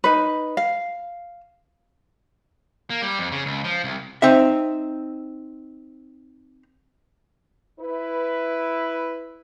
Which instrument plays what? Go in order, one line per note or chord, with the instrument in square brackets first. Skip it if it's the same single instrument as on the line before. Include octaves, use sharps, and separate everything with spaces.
[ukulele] D#4 B4
F5
[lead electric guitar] A#3
G3
F2
C#3
C#2
F3
C2
[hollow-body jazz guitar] C4 D#4 E5
[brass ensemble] E4 B4